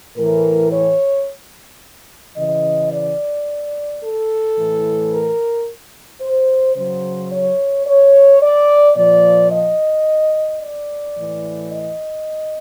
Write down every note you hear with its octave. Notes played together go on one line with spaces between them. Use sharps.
A2 E3 A#4
C#5
C#3 E3 D#5
D5
A4
A2 E3
A#4
C5
C#3 F#3 C5
C#5
C#5
D5
A#2 F3 D5
D#5
D5
A2 E3
D#5